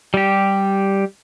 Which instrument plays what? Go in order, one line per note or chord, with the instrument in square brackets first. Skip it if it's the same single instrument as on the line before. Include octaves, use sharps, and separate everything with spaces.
[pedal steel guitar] G3 G4